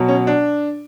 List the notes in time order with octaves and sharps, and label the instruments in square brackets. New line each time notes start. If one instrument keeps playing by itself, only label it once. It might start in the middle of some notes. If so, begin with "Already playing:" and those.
Already playing: [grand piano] B2 F#3
C#4
D4